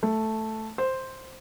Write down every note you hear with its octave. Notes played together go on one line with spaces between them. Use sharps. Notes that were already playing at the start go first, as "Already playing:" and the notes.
A3
C5